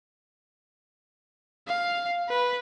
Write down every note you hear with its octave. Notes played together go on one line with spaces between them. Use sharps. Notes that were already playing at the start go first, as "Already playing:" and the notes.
F5
B4